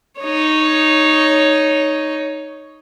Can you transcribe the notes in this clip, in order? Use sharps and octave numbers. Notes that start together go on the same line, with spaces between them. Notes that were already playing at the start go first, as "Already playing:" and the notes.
D#4 C#5